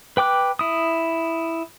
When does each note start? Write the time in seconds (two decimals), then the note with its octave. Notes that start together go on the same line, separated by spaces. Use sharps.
0.17 B4 G5 D6 F#6
0.59 E4 D#6